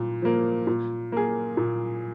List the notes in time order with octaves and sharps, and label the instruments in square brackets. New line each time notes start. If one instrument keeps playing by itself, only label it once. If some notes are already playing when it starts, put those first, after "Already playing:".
Already playing: [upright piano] A#2
F3 A#3
A#2
A#3 G#4
A#2